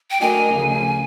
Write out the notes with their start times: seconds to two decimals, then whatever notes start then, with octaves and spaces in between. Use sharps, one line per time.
0.11 G5
0.20 A3 D4 F#4 A#4 D#5 G#5
0.54 D2 C#3 F3